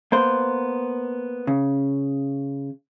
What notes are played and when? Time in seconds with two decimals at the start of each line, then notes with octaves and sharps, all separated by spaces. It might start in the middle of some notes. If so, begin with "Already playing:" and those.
0.12 A#3 B3 C5
1.47 C#3